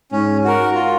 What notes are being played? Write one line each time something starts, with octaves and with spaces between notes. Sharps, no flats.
G#2 C#4
F#4 A#4
F4